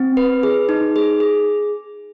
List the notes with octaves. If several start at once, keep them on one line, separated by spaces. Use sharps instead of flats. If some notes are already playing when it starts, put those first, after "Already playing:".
Already playing: C4
B4
G#4
D#4
G#4
G#4